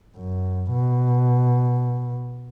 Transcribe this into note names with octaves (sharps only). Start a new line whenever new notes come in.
F#2
B2